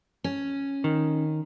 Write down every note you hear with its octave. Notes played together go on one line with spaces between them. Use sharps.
C#4
D#3